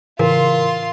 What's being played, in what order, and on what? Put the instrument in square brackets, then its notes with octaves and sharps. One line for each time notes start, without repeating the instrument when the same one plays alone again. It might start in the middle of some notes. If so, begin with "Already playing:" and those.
[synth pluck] A2 C#3 E3 [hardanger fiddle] F4 C6 [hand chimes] A#4